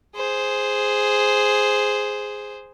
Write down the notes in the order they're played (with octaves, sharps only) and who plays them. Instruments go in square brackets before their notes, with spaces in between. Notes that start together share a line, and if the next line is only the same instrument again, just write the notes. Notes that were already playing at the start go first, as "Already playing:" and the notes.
[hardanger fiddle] G#4 C5